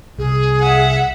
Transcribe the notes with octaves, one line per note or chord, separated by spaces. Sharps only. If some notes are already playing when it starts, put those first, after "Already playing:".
C2 G#4
E5 F#5